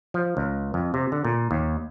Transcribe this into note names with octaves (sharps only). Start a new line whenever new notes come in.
F3
C#2
F2
C3
D3
A#2
D#2